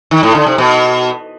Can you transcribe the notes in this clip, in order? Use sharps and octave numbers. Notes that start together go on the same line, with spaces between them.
D#3
A2
D3
C3
B2